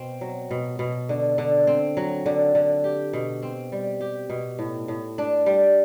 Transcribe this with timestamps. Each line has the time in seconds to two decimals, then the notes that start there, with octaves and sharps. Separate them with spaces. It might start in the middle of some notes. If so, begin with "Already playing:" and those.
Already playing: B2 C4
0.21 F#3
0.51 B2
0.79 B2
1.09 D3
1.38 D3
1.67 C4
1.97 F#3
2.26 D3
2.55 D3
2.84 G4
3.13 B2
3.43 C4
3.72 G3
4.01 G4
4.30 B2
4.59 A2
4.88 A2
5.18 D4
5.46 G3